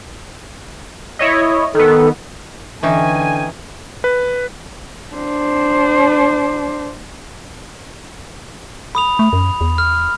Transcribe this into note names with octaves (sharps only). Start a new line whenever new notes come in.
E4 C#5 D#5
D#3 B3 A4
D3 E3 C#4 D#4 G5 G#5
B4
D4 C5
B5 D#6 F7
A3
F#2
E2
F6